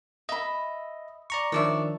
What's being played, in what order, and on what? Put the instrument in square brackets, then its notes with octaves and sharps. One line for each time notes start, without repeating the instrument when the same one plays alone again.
[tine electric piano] D#5 [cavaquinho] E5 B5
[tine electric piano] D5 A#5 C#6
[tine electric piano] D#3 F3 D4 [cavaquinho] C#5 D5 E5